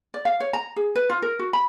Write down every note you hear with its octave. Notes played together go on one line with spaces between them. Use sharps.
D5
F5
C#5
A#5
G#4
B4
F4
A#4
F#4
B5